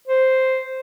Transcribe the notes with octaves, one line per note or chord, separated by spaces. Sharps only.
C5